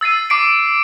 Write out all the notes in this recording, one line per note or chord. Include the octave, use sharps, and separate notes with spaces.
E6 A6 C7 D#7
D6 C7 D7